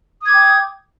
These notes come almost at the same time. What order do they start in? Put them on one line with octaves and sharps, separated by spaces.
D#6 G#6 D6 G5